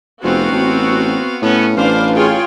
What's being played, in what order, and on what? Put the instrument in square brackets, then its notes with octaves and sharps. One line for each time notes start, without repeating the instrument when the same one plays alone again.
[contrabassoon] F1 [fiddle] B3 F5 [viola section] C4 F#4
[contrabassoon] A1
[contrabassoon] A2 [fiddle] B3 C#4
[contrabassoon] A1 [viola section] D4 B4 F5 [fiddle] C5
[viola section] F4 G#4 C#5 [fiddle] G5